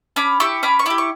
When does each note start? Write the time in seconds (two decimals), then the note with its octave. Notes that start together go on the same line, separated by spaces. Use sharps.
0.16 C#4 B5 D6
0.40 E4 G4 C#6 E6
0.63 C#4 B5 D6
0.79 C#6
0.86 E4 G4 B5 D6
0.98 C#6